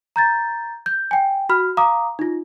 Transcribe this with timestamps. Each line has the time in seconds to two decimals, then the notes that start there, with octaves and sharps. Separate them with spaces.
0.16 A#5 G6 A6
0.86 G6
1.11 G5 G#5
1.49 F#4 B5 F6
1.77 F5 A#5 D6 D#6
2.19 D#4 F4